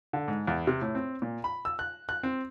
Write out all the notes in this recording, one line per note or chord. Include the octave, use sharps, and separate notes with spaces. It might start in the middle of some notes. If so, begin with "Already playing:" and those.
D3
G#2
E2
C3
A2
C4
A#2
B5
E6
F#6
F#6
C4